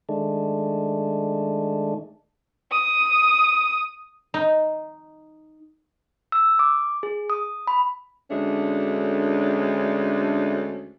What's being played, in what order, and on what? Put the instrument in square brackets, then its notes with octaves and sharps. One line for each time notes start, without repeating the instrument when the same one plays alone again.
[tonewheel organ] D#3 G#3 A3 D4
[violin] D#6
[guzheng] D#4
[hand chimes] E6
D6
G#4
D#6
B5
[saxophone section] D2 G#3 A3 C#4 D4